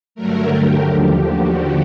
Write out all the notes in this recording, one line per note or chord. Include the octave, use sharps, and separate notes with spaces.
G2 D3 F#3 A3 A#4
G4
D#2 D3 F3
F#4